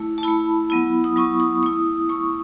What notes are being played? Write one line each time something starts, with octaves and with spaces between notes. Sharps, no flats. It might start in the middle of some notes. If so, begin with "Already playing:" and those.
Already playing: A3 E4
A5
A3 E4 B5
F#3 B3 E4
D#6
F#3 B3 E4 C#6
D#6
A3 E4 D#6
A3 E4 C#6